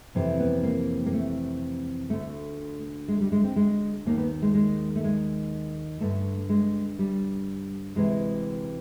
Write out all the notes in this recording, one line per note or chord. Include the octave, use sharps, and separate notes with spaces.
F2 C3 E3 C4
B3
A#3
A#3
A3
D2 D3 A3
G#3
G3
G#3
C4
G#3
D#2 D#3 A#3
B3
G#3
G#3
A3
G#3
G2 D3 A3
G#3
G3
D2 C3 E3 G#3